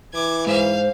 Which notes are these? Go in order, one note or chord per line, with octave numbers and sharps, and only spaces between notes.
E3 D6 G#6
G#2 C5 F5